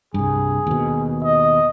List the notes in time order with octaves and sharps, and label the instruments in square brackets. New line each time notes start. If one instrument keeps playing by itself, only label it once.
[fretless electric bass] C2 G2 [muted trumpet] G#4
[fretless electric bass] D#2 B2
[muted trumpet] D#5